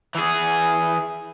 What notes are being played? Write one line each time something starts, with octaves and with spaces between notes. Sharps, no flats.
E3 G#4